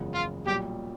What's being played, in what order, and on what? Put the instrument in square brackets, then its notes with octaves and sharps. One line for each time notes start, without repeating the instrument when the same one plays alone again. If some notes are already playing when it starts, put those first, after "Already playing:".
Already playing: [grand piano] F#1 E2 C#3 F3 G#3
[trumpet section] F4
[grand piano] B1 A#2 G3 [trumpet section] G4